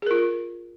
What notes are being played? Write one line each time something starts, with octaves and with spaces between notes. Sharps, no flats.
F4 G#4 A#4